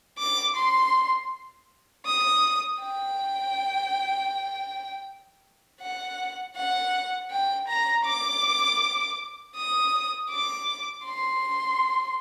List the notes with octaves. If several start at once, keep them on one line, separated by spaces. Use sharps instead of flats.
D6
C6
D#6
G5
F#5
F#5
G5
A#5
D6
D#6
D6
C6